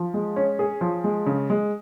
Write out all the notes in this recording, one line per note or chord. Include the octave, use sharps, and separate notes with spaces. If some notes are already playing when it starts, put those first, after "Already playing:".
Already playing: F3
G#3
C#4
G#4
F3
G#3
C#3
G#3